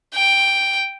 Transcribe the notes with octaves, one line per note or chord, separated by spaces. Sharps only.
G5